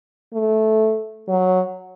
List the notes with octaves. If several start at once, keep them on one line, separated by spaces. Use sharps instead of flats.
A3
F#3